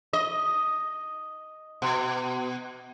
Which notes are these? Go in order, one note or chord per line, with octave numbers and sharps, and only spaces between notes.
D#5
B2